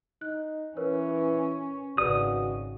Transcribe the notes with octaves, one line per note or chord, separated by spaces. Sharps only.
D#4 F#6
E3 C#4 A#4 B4 C#5
G#1 C#3 F#4 G#4 B4 D5 D#6